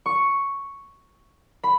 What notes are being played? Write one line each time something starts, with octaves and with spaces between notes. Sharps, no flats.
C#6
B5